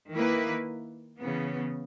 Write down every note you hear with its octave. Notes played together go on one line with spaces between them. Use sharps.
D#3 A#3 E4 B4
C#3 E3 B3